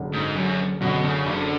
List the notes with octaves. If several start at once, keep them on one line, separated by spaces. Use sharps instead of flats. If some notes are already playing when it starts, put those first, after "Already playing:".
Already playing: F#1 F#2 D3
G#2
F#1 F#2
F#2 B2 D3
C#3
F#1 D3